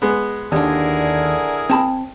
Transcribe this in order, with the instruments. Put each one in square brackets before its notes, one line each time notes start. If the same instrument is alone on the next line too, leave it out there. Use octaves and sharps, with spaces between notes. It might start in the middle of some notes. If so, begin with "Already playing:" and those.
[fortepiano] G#3 B3
[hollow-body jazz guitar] D#2 D4 [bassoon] D3 [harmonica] E4 G#4 A#4
[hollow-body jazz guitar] C4 A5 B5